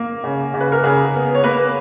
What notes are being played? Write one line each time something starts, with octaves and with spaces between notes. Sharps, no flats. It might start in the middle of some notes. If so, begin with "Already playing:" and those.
Already playing: A#3
C#3
C#3
B4
A#4
C#3 G#4
B3
C#5
A#3 B4